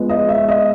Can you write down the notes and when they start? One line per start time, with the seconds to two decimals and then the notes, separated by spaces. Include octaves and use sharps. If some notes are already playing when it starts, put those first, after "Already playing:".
Already playing: F3 G#3 B3
0.09 D#5
0.29 E5
0.48 D#5